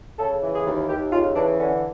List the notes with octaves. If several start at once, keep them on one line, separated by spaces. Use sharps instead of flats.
C#3 A4
E3
G#4
D#2
D#2 G4
C#3 F4
E3 D4
D3 C#4